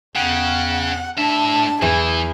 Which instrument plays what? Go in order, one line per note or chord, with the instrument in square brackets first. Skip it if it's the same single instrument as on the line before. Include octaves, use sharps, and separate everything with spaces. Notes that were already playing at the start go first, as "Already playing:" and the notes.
[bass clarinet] E2 [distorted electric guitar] C#3 [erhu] F#5 [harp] G5
[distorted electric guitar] A2 E5 [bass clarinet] D4 [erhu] A5
[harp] E2 [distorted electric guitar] E3 [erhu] G#4